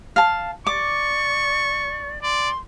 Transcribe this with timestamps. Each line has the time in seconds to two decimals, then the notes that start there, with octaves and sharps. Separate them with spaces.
0.16 F5 A5
0.67 D5 C#6 D6
2.22 D5 C6